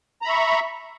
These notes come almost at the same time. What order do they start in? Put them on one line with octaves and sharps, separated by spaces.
A#5 B5 E5 C#6